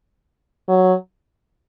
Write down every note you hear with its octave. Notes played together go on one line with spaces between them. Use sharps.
F#3